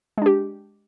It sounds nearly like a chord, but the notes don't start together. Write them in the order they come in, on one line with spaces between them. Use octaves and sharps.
G#3 D4 G4